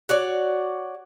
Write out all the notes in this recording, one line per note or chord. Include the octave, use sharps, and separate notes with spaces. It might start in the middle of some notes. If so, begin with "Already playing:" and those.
F#4 C#5 D5